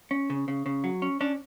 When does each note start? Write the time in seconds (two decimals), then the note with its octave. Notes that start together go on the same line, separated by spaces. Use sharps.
0.11 C#4
0.30 C#3
0.48 C#3
0.66 C#3
0.84 F#3
1.02 C#4
1.21 C#4 D4